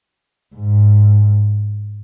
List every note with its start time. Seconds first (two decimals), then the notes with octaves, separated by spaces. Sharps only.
0.56 G#2